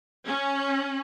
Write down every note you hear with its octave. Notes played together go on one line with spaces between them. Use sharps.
C#4